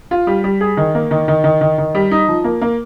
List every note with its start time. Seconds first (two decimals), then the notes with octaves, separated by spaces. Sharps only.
0.11 F4
0.27 G3
0.44 G3
0.61 G#4
0.77 D#3
0.95 A#3
1.11 D#3
1.28 D#3
1.44 D#3
1.61 D#3
1.78 D#3
1.95 G3
2.11 D#4
2.28 F3
2.44 A#3
2.61 A#3